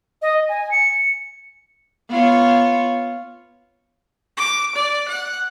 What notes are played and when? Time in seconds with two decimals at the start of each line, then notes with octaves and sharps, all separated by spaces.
0.22 D#5
0.49 G#5
0.71 C#7
2.10 B3 F4 C#5
4.37 D6
4.75 D5
5.08 F#5